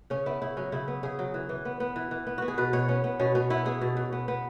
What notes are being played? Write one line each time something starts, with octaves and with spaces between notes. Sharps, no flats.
C#3 C#4
B3 E4
C#3 E4
F#3 C#4
C#3 E4
B3
C#3 G#4
F#3
E3
E3
B3
B3
E3
E3
B3
B3 F#4
G#4
B2 B4
B2 C#5
B3 C#4
B3
B2 C#4
B2 C#4
B3 E4
B3 G#4
B2
B2
B3
B3